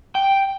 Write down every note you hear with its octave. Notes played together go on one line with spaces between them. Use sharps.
G5